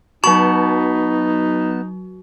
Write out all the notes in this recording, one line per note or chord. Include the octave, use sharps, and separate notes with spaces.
F#3 B3 D#4 F#4 A5 C#6